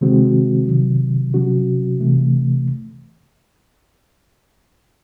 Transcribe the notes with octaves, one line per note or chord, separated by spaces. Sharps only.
C3 D#3 G#3 C4 F#4
C3 D#3 F#3
C3 F#3 C#4 F#4
C3 E3 A3